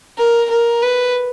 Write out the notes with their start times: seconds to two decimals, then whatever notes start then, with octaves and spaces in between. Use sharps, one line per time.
0.18 A#4
0.50 A#4
0.82 B4